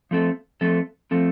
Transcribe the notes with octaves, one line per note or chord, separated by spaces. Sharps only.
F3 A3 C4 A4
F3 A3 C4 A4
F3 A3 C4 A4